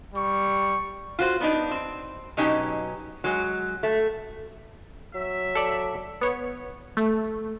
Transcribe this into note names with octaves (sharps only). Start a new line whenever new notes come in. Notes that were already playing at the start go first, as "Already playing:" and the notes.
G3 C#6
F4 F#4 C5
B3 D4 D#4
C4
B2 F#3 C#4 D#4 G4
F#3 G#3
A3
F#3 E5
A4 D5
B3 C#5
A3